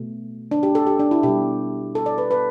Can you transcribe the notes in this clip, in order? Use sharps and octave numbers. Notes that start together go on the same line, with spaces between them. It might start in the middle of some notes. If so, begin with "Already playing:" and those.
Already playing: B2 A3
D4
G4
A4
G4
D4
E4
B2 G3 G4
A4
D5
B4
B4